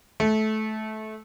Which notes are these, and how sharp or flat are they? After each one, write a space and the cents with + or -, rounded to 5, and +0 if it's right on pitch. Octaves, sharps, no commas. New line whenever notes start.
A3 -20